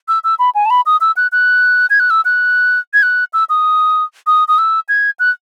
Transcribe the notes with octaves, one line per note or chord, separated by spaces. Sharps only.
E6
E6
B5
G#5
A5
B5
D#6
E6
F#6
F#6
G#6
F#6
E6
F#6
G#6
F#6
E6
D#6
D#6
D#6
E6
G#6
F#6